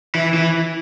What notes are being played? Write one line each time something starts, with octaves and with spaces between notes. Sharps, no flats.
E3
E3